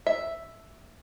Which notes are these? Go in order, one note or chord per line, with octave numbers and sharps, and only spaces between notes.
E5